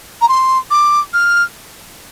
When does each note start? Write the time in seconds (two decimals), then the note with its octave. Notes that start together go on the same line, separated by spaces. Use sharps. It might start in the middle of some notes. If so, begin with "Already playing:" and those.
0.21 A#5
0.29 C6
0.71 D6
1.13 F6